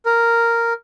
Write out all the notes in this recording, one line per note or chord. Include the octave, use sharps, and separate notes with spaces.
A#4